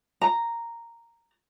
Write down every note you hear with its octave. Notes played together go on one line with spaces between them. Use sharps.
A#5